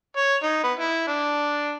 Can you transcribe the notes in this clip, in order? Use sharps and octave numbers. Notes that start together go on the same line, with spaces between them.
C#5
D#4
B3
E4
D4